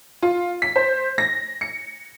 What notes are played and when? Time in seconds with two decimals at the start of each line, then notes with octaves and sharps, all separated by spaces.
0.22 F4
0.62 B6
0.76 C5
1.18 A#6
1.61 C#7